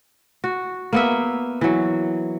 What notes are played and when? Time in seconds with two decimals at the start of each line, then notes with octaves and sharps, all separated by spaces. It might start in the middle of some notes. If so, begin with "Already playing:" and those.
0.44 F#4
0.93 A#3 B3 E5
1.61 E3 F#3